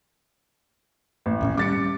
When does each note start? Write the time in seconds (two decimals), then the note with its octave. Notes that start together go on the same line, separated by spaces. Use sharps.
1.26 A1
1.41 D#2 A2 C#4
1.57 G3 C#4 D6 A6 C#7